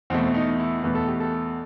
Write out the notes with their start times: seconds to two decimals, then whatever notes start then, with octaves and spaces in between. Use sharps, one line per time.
0.10 E2 B2 A3 C4
0.35 D#4
0.59 E4
0.83 E2 B2 A3 B4
0.95 A4
1.08 G4
1.20 A4